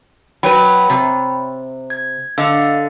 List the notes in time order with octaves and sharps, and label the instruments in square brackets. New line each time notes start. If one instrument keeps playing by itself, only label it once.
[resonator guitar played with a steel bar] F#3 B4 [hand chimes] C#5 G5 B5
[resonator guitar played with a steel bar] C3
[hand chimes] G#6
[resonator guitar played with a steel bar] D3 [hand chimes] D#5 F5 E6